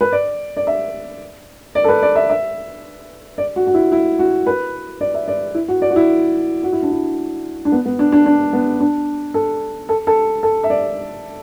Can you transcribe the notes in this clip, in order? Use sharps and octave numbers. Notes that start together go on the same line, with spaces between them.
B4
D5
D5
E5
D5
A4
B4
D5
E5
E5
D5
F#4
F#4
E4
E4
F#4
B4
D5
E5
D5
E4
F#4
D5
F#4
E4
F#4
E4
D4
E4
D4
B3
B3
D4
D4
D4
B3
D4
A4
A4
A4
A4
E5
D5